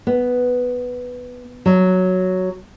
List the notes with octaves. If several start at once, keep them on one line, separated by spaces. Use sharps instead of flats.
B3
F#3